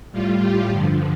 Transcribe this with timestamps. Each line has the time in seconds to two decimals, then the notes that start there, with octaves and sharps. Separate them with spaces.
0.12 A2 G3 F4
0.41 G4
0.70 G2 D3 F3